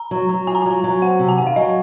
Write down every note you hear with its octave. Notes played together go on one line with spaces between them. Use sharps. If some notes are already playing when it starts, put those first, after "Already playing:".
Already playing: A#5
F#3
F#3
F4 G#5
A#5
F#3 G#5
F#3
C4 F#5
C3
G#5
D#3 F#5
F5
F#3 D#5